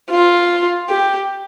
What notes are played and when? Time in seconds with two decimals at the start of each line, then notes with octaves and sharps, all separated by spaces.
0.10 F4
0.89 G4